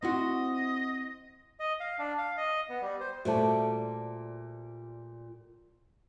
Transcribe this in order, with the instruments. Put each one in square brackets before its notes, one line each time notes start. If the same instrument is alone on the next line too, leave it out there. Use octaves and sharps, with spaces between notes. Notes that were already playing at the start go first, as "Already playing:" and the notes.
[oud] C4 E4 F#4 [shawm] D#5
[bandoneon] D#5
F5
D4
F5
D#5
B3
G3
C5
[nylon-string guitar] A#2 G3 A3 [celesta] F#4 C5 A5